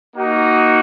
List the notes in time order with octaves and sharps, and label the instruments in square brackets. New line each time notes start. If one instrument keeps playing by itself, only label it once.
[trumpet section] A#3 D#4 F#4